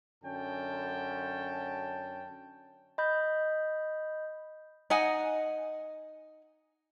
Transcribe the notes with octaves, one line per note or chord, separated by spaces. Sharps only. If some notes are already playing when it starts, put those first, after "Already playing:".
F#2 D3 C#4 G5 A5
D#5 B5 G6
D#4 D#5 F#5 G#5